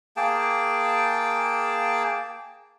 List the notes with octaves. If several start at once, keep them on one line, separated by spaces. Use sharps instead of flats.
A#3 G#4 G5 A5